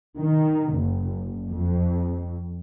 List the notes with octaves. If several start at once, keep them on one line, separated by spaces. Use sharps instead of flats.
D#3
F#1
F2